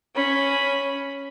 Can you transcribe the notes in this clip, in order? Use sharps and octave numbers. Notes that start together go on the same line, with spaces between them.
C#4 B5